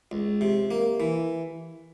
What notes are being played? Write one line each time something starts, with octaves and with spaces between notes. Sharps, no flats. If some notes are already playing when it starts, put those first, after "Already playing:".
C#2
C3
A#3
E3